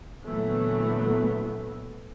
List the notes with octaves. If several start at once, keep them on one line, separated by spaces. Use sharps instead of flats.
A#2 D3 E3 F#3 A3 B3